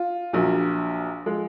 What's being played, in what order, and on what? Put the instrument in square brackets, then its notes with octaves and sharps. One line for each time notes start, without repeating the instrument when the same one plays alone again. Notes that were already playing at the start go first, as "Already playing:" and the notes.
Already playing: [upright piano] F4
A#1 A#2 F#3
F3 G#3